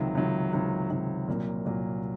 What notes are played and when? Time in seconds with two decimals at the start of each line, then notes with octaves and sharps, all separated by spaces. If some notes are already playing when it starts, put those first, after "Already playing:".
Already playing: C#2 C3 D#3 F#3
0.15 C#2 C3 D#3 F#3
0.53 C#2 C3 D#3 F#3
0.90 C#2 C3 D#3 F#3
1.28 C2 A#2 F#3 A#3
1.65 C2 A#2 F#3 A#3